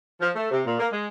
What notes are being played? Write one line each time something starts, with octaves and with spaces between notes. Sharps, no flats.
F3
A3
C3
A#2
A#3
G#3